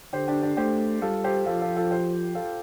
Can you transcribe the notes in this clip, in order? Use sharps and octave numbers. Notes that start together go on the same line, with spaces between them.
D3 G4 C5
D4 G4
D4 G4
A3 G4 C5
G3 F4 A4
G4 C5
F3 F4 A4
F4 A4
F4 A4
G4 C5
F4 A4